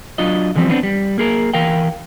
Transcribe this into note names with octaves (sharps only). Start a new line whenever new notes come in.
F#3 D4 F4 D#5
D3 E3 F3 G3 C4
B3 C4 D4
G3
A#3 G#4 A#4
E3 A#4 F5 G5